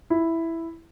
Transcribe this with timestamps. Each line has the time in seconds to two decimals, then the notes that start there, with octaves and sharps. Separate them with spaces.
0.10 E4